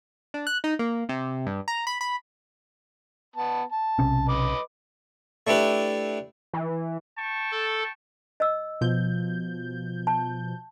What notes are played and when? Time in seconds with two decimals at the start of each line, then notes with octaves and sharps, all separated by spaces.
0.34 D4
0.47 F#6
0.64 D#4
0.79 A#3
1.09 C3
1.47 G2
1.68 A#5
1.87 B5
2.01 B5
3.36 B3 A5
3.72 A5
3.99 B1 C3 C#4
4.29 B4 D#5 D6
5.47 A3 D4 E4 G4 B4
6.53 E3
7.17 G5 A5 C#6
7.52 A4
8.40 D#5 E6
8.81 B2 F3 G6
10.07 A5